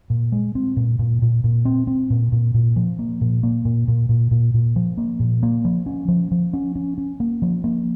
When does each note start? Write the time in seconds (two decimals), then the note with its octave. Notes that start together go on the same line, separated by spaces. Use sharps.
0.10 A#2
0.32 G#3
0.55 C4
0.77 A#2
0.99 A#2
1.22 A#2
1.44 A#2
1.65 C4
1.87 C4
2.10 A#2
2.32 A#2
2.54 A#2
2.76 F3
2.99 A#3
3.21 A#2
3.43 A#3
3.65 A#2
3.88 A#2
4.09 A#2
4.31 A#2
4.54 A#2
4.76 F3
4.98 A#3
5.20 A#2
5.43 A#3
5.65 F3
5.86 C#4
6.08 F3
6.32 F3
6.53 C#4
6.76 C#4
6.98 C#4
7.20 A#3
7.42 F3
7.64 A#3